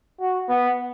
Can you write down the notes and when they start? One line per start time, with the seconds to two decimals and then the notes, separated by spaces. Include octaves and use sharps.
0.20 F#4
0.49 B3